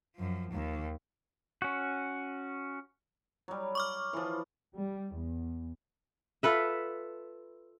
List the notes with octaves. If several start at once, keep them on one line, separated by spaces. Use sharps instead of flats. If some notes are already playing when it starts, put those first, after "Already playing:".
F#2 F3
D#2
C#4 F#4
F#3 G3
C#6 D6 F6
E3 F3
G3
E2
F4 A4 B4 E5